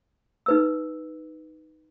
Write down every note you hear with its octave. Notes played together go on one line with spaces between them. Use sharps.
D#4 B4 E6